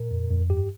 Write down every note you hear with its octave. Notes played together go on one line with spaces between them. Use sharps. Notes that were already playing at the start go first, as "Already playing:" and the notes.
Already playing: A#2 A#4
F2
F2
G2 G4